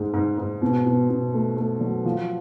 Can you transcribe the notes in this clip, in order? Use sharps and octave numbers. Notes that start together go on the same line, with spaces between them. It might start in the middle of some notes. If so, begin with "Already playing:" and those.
Already playing: G#2 G#3
G#2
G#2
B2
B2
B2
A3
A3
F#3
F3